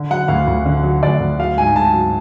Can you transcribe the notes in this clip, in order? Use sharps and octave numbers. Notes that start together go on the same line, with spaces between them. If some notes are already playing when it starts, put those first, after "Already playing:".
Already playing: D3
F#3 F#5
D2 F5
D2
D3
F#3
D2 D5
D2
F#3 F5
G#2 G#5
G#2 A5
F#3